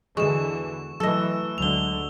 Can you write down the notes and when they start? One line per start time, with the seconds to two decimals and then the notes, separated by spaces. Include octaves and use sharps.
0.17 E2 D3 E3 G#3 F#4 C#6 E7
1.00 E3 F#3 A3 A4 D#5 E6
1.58 D2 D3 F#3 G#3 F7 G7